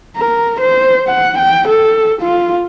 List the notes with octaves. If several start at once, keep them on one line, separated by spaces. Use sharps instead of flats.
A#4
C5
F#5
G5
A4
F4